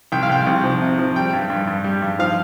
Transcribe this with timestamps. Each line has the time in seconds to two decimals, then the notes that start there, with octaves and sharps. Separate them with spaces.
0.12 C2 G5
0.23 F5
0.29 C2 G5
0.47 C2
0.64 F3
0.82 C3
0.99 F3
1.16 G3 G5
1.33 G2
1.50 G2
1.67 G2
1.84 G3
2.02 G2
2.19 F3 F5